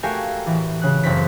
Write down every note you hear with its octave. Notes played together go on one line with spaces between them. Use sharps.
A3 F#4 G4 A#4 F5 G#5
A2 E3
C#3 F#6
F#1 F#2 C4 B6